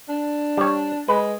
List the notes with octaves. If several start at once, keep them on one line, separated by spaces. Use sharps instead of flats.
D4
G3 C#5
G#3 B4